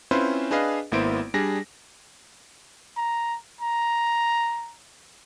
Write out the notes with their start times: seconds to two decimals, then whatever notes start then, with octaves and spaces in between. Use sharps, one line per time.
0.11 C4 C#4 E4 F4 B4 C5
0.51 D4 G#4 B4 D#5 F5
0.92 G#1 A#3 B3 E4 C5 D7
1.34 G3 D4 G#4 A#6
2.97 A#5
3.61 A#5